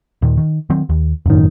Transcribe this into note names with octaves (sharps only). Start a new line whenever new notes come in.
D#2 A#2 D#3
D#3
D#3 F#3 C4
D#2
E1 F#2 A2 D#3